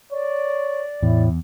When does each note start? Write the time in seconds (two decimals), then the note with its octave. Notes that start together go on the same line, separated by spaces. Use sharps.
0.11 C#5 D5
1.03 E2 A2 E4